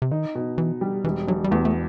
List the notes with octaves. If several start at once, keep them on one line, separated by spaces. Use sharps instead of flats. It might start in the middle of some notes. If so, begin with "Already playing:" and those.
C3
D#3 D#4
B2
B2 E3
G3
E1 E3
E1 F#3
G3
E2 A3
A3